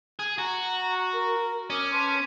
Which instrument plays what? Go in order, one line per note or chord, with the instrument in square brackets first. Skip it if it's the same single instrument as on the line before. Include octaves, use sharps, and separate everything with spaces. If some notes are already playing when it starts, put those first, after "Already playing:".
[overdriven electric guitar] G#4
[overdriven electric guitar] F#4 [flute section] A#5
[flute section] A#4
[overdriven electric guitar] C#4 [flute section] D6 D#6 F6
[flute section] B4 A5 C6